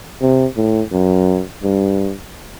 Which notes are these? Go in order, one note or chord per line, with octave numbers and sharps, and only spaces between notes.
C3
A2
F#2
G2